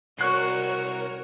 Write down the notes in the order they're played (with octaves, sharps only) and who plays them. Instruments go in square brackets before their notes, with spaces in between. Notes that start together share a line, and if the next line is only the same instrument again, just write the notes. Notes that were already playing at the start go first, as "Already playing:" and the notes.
[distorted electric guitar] C2 [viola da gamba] F#4 [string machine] A#4 C#5 [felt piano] C#6 F#6 C7